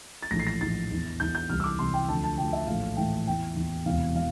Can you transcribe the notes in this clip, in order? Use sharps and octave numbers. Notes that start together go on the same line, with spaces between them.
A6
A#1 A2 E3 A#6
C7
A#6
A#1 A2 E3 A6
E2 E3
E2 E3 G6
G6
C2 C3 E3 F6
E6
D6
C2 C3 E3 C6
G5
D2 D3 F3 A5
A5
D2 D3 F3 G5
E5
A#1 A2 E3 F5
A#1 A2 E3 G5
E2 E3 G5
E2 E3
E1 E2 C3 E3 F5
E3 F5